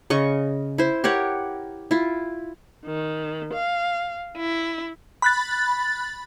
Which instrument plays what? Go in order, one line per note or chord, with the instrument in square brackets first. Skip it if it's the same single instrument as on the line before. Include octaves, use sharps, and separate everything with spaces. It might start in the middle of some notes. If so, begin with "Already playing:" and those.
[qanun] C#3 D#5 C#6
E4 C5
G4 A#4 C#5 F#5
E4 F4
[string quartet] D#3
F5
E4
[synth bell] B5 F#6 A6